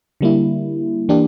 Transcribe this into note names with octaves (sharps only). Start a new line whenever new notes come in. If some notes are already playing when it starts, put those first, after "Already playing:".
D3 G3 A#3 E4
E3 A#3 D4 G4